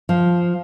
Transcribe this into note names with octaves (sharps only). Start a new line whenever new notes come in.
F3